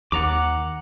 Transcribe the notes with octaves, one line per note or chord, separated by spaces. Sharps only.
D#2 F#5 A#5 D6